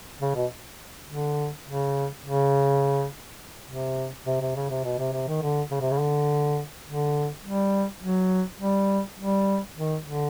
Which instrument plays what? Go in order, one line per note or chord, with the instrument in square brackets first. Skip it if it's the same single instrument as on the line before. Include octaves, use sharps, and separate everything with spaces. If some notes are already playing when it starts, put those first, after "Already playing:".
[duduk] C#3
B2
D3
C#3
C#3
C3
C3
C3
C#3
C3
B2
C3
C3
D#3
D3
C#3
C3
C#3
D3
D3
G3
F#3
G3
G3
D#3
D3